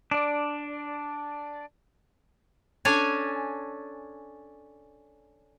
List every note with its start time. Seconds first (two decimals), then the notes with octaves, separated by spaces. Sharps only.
0.11 D4 D5
2.85 C#4 D4 A4 C#5 G#5